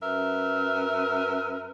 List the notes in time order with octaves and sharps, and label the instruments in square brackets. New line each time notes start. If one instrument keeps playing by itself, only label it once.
[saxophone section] F#2 A#4 B4 E5